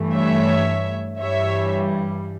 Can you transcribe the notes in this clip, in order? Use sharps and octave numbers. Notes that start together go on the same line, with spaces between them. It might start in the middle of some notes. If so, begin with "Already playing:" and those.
Already playing: G2 E3 A3
C#5 E5
G2 E3 G3 C#5 E5